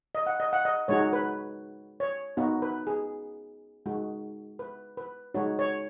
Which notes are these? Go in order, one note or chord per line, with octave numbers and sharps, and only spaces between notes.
D#5
F#5
D#5
F#5
D#5
G#3 D#4 F#4 C#5
B4
C#5
B3 D#4 F#4
B4
G#4
G#3 D#4 F#4
B4
B4
G#3 D#4 F#4 C#5
C#5